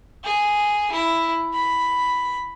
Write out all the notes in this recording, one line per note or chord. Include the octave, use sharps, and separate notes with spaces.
G#4
E4
B5